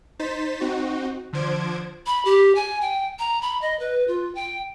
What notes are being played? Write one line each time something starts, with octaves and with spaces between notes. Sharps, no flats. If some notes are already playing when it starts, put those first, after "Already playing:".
D#4 C5 A6 B6 E7
C4 D#4 F#4
D3 F3 C5 G#6 D7
B5
G4
G#5
G5
A#5
B5
D#5
B4
F4
G5